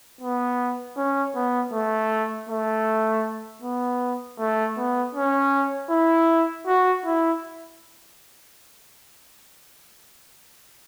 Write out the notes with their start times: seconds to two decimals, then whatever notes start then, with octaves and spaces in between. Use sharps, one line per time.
0.21 B3
0.97 C#4
1.35 B3
1.72 A3
2.49 A3
3.62 B3
4.39 A3
4.77 B3
5.15 C#4
5.90 E4
6.67 F#4
7.05 E4